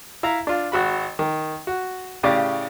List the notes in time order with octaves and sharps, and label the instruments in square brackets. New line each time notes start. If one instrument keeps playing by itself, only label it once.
[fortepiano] E4 E5 F5 A#5
D4 F4
G#1 F#4 B5
D#3
F#4
A2 C#3 G4 D5 F5